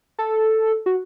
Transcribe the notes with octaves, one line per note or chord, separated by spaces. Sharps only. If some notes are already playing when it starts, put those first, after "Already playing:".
A4
F#4